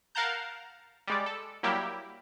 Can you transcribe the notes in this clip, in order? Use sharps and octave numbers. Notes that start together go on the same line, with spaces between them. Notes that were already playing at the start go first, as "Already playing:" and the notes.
A#4 F5 F#5 A5 A#5 G6
G3 G#3 D5
A4
F#3 G3 A#3 E4 G4